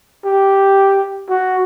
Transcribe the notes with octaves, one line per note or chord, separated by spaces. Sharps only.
G4
F#4